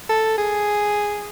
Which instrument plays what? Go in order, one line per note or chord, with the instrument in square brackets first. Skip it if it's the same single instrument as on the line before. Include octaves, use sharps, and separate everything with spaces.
[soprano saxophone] A4
G#4